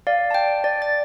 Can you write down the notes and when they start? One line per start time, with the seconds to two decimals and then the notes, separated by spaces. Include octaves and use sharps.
0.07 D5 F5
0.31 G5 A5
0.64 D5
0.82 A6